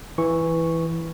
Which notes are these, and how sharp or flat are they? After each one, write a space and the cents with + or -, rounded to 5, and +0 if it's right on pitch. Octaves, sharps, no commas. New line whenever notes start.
E3 +0 C#6 +0